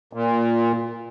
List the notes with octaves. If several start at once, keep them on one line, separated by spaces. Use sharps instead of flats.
A#2